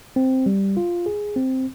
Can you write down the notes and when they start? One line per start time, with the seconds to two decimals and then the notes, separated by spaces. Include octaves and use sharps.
0.16 C4
0.46 G3
0.77 F4
1.06 G#4
1.36 C4